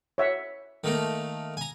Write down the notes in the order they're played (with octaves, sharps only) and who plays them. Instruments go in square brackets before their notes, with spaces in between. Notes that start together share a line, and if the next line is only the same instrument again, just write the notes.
[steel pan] C#5 E5 F#5
[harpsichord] D#3 A3 A#3
G#5 A#5